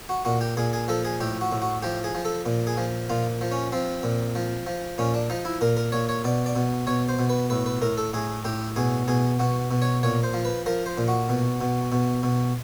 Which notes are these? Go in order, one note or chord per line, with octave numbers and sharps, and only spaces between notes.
F#4
A#2 F#4
G4
A#2 G#4
G#4
F3 A4
G#4
A2 G4
F#4
A2
F#4
F3 G4
G#4
F3
A4
A#2
G#4
F3
A#2 F4
F3
C#4
F3 C4
A#2
F3
F3
A#2 C#4
D4
F3 D#4
E4
A#2 A#4
A#4
A#2 C#5
C#5
B2 D5
D5
B2
B2 C#5
C5
B2
B4
A2 B4
B4
A2 A#4
A4
A2 G#4
A2 G4
B2 G#4
B2 G#4
B2 F#4
B2
C#5
A#2 C#5
C5
F3
B4
F3 A#4
C5
A#2
F#4
B2
B2
B2
B2